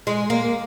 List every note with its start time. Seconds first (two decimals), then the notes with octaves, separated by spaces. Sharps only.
0.07 G#3
0.30 A#3